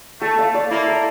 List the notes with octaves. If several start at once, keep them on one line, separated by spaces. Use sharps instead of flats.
A3 A4
F5
D5
A#3 E4
A4